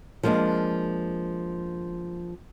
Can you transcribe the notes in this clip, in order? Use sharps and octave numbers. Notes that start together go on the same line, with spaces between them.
F3 G#3 A#3 D4